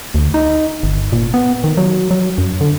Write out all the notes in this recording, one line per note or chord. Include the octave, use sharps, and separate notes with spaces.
D2
D#4
G1
A#2
B3
D#3
F#3
F#3
F#2
D3